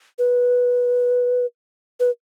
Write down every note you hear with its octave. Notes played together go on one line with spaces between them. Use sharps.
B4
B4